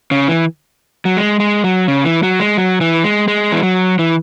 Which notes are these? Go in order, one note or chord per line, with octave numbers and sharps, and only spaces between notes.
C#3
E3
F#3
G#3
G#3
F#3
C#3
E3
F#3
G#3
F#3
E3
G#3
G#3
E3
F#3
E3